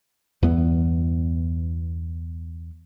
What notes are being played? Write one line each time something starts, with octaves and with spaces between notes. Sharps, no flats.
E2 G2 E3 B3